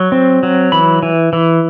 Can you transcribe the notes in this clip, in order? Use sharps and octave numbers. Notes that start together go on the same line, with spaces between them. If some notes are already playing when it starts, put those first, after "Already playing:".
Already playing: F#3
C4
F#3
E3 B5
E3
E3